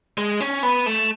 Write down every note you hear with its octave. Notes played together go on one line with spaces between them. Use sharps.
G#3
C#4
B3
A3